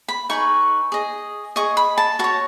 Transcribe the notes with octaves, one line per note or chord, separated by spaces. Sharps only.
B5
D#4 G#4 B4 C#6
G#4 D#5
G#4 D#5 C#6
B5
A5
F#4 C#5 A5